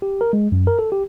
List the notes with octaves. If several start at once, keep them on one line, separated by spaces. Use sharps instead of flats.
G4
A#4
G#3
F#2
A#4
A4
G4